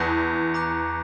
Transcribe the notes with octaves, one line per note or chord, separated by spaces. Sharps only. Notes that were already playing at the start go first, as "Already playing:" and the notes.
Already playing: E2 A5 C#6 F#6 A#6 C#7
A#5 D6 F#6